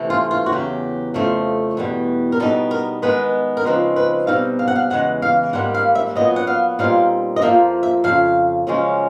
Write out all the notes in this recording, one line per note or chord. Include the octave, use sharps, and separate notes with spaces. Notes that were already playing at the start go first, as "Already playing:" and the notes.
Already playing: C3 E3 A3
F4
F4
F#4
E2 C#3 F#3 G4
F2 C#3 F3 A3
E2 B2 G3
A#4
B2 G3 B3 D#4 A4
A#4
D#3 G#3 B3 B4
A#4
C#3 F3 G#3 C4 D#4 B4
B4
B2 G3 C4 D#4 F5
F5
F#5
F5
E2 C#3 E3 G#3 F#5
F5
G#2 D#3 G3 A#3 F#5
F5
E5
A#2 F#3 B3 D#5
F#5
F5
A#2 G3 C4 D#4 F5
D#5
F2 D3 F3 A#3 E5
E5
F2 C#3 F5
F#2 C#3 F3 G#3 C#4